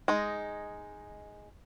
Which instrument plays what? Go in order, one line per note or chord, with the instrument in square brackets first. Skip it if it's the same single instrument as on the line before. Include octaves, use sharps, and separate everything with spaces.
[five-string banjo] G#3 D#4